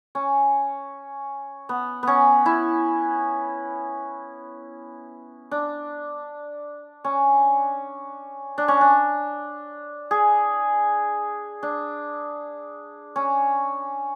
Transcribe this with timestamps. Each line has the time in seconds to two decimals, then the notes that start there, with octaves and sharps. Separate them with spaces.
0.15 C#4
1.69 B3
2.03 B3 C#4
2.46 E4
5.51 D4
7.04 C#4
8.58 D4
8.68 C#4
8.81 D4
10.11 G#4
11.63 D4
13.16 C#4